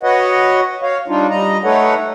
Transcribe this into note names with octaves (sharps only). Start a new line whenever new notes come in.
F#4 B4 C#5 D#5 F#5
C#5 F5
G3 D4 D#4 F4
G3 D#5 A#5
A3 D#4 A4 B4 C#5 F#5